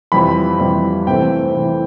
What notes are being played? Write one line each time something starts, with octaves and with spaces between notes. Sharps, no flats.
F2 C3 E3 G3 B5
F2 C3 E3 G3
C3 E3 A3 C4 G5
C3 E3 A3 C4